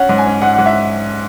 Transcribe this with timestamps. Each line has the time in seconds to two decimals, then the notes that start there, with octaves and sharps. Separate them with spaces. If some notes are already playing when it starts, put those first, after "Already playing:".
Already playing: C#4 F#5
0.09 G#2
0.18 G#5
0.26 C#4
0.42 G#2 F#5
0.53 G#2 F#5
0.66 E5